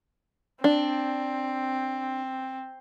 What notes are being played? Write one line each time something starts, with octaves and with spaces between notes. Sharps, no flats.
C4 D4